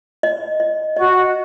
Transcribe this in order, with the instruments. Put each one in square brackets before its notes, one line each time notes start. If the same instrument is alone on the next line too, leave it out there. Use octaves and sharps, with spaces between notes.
[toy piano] D#5
D#5
[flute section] F#4 [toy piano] D#5